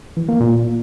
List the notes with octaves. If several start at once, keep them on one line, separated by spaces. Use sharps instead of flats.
E3
A#3
A#2